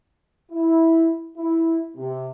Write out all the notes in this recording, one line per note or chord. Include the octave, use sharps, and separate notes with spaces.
E4
E4
C3